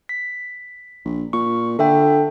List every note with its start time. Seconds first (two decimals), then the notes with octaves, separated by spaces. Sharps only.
0.09 B6
1.05 A#1
1.33 A#2 C#6
1.79 D3 A4 E5 G5